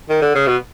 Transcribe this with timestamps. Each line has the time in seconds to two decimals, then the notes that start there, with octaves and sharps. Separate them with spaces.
0.09 D#3
0.22 D3
0.35 C#3
0.47 B2